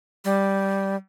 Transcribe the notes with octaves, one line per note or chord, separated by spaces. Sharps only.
G3